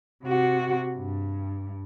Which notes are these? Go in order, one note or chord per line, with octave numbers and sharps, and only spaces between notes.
C3 F#4
G2